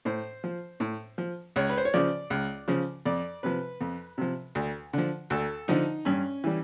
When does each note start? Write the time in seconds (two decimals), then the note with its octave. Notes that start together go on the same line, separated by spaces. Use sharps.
0.05 A2 C5
0.44 F3
0.80 A2
1.18 F3
1.56 C#2 C#5
1.70 B4
1.78 C5
1.85 C#5
1.94 C#3 F3 D5
2.30 C#2
2.68 C#3 F3
3.06 F2 D5
3.43 C3 F3 B4
3.81 F2
4.18 C3 F3
4.55 D2
4.93 D3 F3
5.30 D2 A4
5.68 D3 F3 D#4
6.05 G2 C#4
6.44 E3 G3